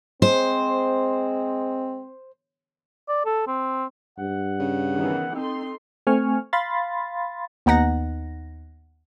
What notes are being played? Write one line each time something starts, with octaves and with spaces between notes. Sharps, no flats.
G#3 C4 C5
D5
A4
C4
G2 F#5
C#3
D#3 E3 B3
C4 D#4 A4 C6
A3 C4 G#5 C#6 F6
F5 B5 C6 A6
D#2 B3 D#4 F#5 A#6